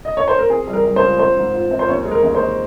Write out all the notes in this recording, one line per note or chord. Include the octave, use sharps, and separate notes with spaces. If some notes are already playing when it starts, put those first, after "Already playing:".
D#5
C#5
C5
A#4
C4 G#4
G3
A#4
G3
C#2 C5
C4 C5
G#2
F4
C4
C5
D#2 C#5
G#3
A#4
D#2
C5
D#4